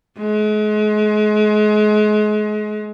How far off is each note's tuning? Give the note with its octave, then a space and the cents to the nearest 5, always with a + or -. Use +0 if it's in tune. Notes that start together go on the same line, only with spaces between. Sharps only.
G#3 +35